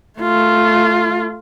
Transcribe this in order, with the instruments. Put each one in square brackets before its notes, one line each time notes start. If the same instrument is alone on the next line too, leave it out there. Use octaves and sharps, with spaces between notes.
[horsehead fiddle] A3 F4